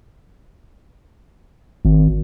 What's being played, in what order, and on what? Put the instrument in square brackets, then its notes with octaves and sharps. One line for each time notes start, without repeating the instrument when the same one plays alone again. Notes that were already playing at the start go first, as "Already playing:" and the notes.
[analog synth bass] G#1